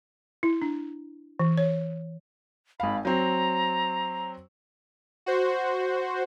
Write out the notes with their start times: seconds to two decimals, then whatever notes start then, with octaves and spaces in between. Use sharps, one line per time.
0.43 E4
0.62 D4
1.39 E3
1.58 C#5
2.80 G#1 F5 B5
3.05 F#3 C4 A#5
5.26 F#4 C5